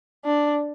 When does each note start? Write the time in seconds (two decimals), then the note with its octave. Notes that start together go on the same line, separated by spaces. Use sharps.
0.25 D4